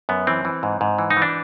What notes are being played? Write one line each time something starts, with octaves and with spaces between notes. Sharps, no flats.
F#2 B3
E3 C4
E3
G#2
G#2
E3
D#4
E3
D4